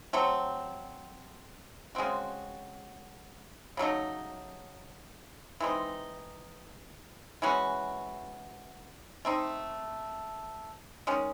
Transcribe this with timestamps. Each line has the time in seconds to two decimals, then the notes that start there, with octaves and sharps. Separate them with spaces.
0.13 F#3 A3 C4
1.95 C#3 G#3 C4 F#4
3.77 C#3 F#3 A3 D#4
5.60 E3 G#3 C4 D#4
7.42 E3 G#3 C#4 F#4
9.25 A3 C4 D#4
11.07 D#3 G#3 C#4